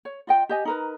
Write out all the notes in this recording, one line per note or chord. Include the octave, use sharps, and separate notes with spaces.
C#5
F4 D#5 G5
G4 D#5 G#5
D#4 A#4 B4